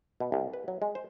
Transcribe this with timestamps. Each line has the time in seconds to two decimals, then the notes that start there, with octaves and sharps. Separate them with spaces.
0.20 B2
0.32 C2
0.53 B4
0.68 F#3
0.82 G#3
0.95 C5